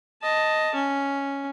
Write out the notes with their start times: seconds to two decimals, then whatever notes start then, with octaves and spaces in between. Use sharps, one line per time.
0.22 D#5 A5
0.74 C#4